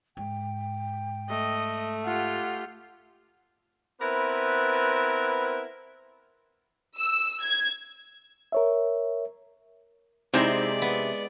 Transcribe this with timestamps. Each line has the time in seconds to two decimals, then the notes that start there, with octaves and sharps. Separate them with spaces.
0.17 G#2 G5
1.30 A3 D#5
2.05 F4 G4 F#5
4.01 B3 C4 E4 A#4 B4
6.97 E6
7.43 G#6
8.52 A#4 C#5 E5
10.34 C3 G#3 C4 D#4 E4 C5 D5 E5
10.82 B3